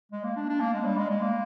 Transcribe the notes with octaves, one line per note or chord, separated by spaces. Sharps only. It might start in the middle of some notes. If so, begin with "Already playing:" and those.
G#3
A#3
D4
D4
A#3
G#3
G3
G#3
G#3
A#3